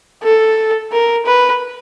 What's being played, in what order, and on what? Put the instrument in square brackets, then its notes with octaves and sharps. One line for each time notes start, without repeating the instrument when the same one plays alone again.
[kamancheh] A4
A#4
B4